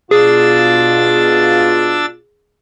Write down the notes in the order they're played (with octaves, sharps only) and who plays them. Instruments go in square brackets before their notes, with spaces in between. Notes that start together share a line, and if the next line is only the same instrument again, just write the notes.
[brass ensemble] B2 F4 [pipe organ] D4 E6 A6 [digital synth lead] G#4